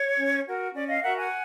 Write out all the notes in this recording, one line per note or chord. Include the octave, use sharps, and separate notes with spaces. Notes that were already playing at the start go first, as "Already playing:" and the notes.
Already playing: C#5
C#4
F#4 A#4
C#4 D5
D#5 F5
F#4 A#4 E5 F#5
F#5 G#5